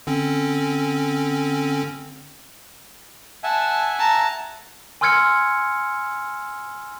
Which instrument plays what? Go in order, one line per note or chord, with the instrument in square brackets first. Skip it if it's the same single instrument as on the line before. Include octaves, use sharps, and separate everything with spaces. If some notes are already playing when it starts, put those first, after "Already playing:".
[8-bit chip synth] D3 C4 C#4
[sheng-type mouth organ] E5 F#5 G#5 [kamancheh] A5
[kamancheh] A5 A#5
[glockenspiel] G#5 C6 E6 F6 G#6 C#7